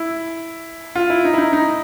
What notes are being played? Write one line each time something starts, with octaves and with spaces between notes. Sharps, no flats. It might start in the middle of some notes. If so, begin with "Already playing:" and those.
Already playing: E4
F4
E4
D#4
E4
D#4
D#4